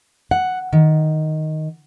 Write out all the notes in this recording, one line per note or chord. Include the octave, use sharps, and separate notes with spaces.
F#5
D#3